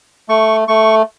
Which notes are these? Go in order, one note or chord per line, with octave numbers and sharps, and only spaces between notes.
A3 C#6
A3 C#6